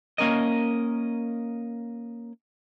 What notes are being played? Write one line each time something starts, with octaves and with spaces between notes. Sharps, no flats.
A#3 C#4 A#4 D#5